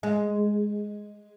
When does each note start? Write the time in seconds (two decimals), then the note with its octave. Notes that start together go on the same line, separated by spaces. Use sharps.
0.03 G#3